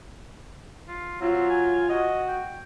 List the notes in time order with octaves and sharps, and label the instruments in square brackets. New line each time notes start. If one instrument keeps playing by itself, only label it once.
[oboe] F4
[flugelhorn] F#3 [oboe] C4 [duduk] F4
[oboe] G#5
[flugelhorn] F#4 [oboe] D#5
[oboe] G5